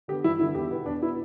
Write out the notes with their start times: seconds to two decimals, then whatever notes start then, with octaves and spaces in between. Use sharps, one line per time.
0.08 D3 B3 G4
0.24 G2 E4
0.39 D3 B3 E4
0.55 E2 G4
0.71 B2 B3
0.86 E2 D4
1.02 B3 E4
1.07 B2